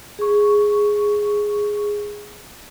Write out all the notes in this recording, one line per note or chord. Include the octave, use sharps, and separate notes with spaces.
G#4 C#6